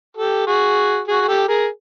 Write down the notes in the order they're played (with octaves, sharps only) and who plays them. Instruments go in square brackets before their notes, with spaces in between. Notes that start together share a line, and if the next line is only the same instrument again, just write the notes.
[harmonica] G4 A4
F#4 G#4
F#4 G#4
G#4
G4 A4
G#4 A#4